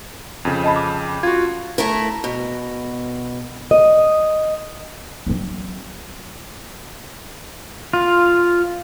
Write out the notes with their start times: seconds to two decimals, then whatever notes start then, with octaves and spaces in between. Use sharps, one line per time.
0.45 F2 C#3
0.64 D#5 A5 B5
0.76 D6
1.23 F4 F#4 G#6
1.78 A3 E4 A#4
2.24 B2
3.71 D#5
5.27 F#3 C4
7.93 F4